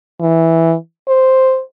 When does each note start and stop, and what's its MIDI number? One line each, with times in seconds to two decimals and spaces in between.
0.21 0.75 52
1.08 1.61 72